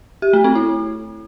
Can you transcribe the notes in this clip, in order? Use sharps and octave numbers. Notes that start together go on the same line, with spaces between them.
G4
A3
C4
E4